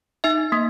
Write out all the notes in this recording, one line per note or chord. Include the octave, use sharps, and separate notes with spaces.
D#4 E5
A#3